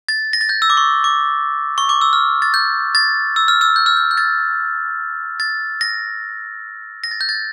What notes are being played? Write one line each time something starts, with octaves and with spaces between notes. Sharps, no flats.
A6
A#6
A6
G6
E6
D6
C#6
D6
C#6
D6
E6
F6
A6
G6
A6
E6
F6
E6
G6
F6
G6
G6
A6
A6
A#6
A#6
A6
G6
A6